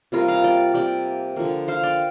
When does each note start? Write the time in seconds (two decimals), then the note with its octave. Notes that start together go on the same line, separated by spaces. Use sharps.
0.12 C3 G3 A#3 F4 A#4
0.28 F5 A#5
0.44 D5 G5
0.74 C3 A#3 D5 G5
1.36 D3 F3 A#3
1.68 C5 F5
1.83 D5 G5